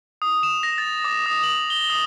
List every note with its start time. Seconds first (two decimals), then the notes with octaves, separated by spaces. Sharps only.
0.22 D#6
0.43 E7
0.63 A#6
0.78 A6
1.05 D6
1.26 D#6
1.43 F#7
1.70 G7
1.90 D#6